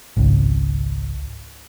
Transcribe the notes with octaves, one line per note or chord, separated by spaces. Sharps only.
G#1 C#2